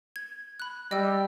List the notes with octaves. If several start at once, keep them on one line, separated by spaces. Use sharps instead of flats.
G#6
B5 F#6
G3 D#5 G5 E6